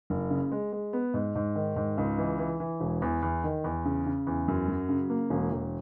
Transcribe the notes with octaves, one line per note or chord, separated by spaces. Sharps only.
F#1
C#3
G#3
G#3
B3
G#2
G#2
D#3
G#2
C#2
E3
E3
E3
E1
E2
E2
D#3
E2
C#3
C#3
E2
F#2
F#3
C#3
A#3
E1
E1